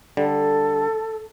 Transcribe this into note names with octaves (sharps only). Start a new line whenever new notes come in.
D3 G3 A4